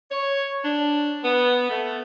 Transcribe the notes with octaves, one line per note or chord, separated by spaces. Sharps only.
C#5
D4
B3
A3